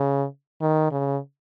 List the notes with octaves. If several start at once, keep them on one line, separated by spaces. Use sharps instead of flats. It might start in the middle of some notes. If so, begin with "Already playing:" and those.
Already playing: C#3
D#3
C#3